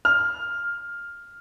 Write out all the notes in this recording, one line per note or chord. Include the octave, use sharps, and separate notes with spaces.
F6